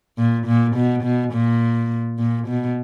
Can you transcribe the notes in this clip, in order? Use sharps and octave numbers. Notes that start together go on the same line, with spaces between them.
A#2
A#2
B2
B2
A#2
A#2
B2